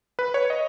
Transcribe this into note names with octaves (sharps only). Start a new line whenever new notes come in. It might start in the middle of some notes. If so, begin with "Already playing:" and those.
B4
C#5
D#5